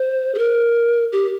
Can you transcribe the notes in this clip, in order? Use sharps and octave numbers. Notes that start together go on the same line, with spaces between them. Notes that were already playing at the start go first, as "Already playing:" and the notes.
Already playing: C5
G#4
A#4
G4